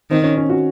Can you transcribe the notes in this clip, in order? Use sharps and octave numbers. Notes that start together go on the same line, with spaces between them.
D#3 C4
C#4
C#4
F#4